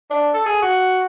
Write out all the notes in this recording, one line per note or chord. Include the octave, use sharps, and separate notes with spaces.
D4
A4
G#4
F#4